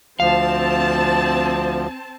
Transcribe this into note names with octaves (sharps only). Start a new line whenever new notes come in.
D2 F3 C4 F5 A5